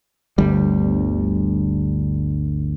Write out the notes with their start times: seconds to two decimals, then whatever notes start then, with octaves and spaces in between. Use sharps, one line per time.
0.38 G1 D2 G3